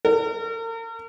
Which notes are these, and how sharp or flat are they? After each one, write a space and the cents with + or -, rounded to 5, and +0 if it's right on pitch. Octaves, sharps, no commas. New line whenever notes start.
A#4 -40